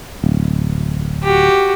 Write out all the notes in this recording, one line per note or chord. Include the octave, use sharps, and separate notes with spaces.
D1
F#4 G4